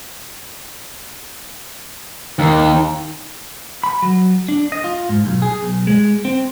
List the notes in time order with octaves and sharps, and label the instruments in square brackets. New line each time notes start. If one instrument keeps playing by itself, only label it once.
[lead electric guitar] D#2
[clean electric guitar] B5
F#3
D4
D#5
F4
G#2
B1
G#4
B1
G#3
C4